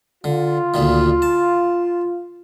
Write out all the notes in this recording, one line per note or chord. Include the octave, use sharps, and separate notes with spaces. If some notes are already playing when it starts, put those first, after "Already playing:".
D3 F4
D2 A#2 D#3
A5